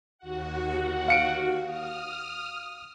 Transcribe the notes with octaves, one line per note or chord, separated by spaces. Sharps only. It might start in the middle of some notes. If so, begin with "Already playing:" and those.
D#2 F#4 F#5
F5 C#7 D7
D#6 F6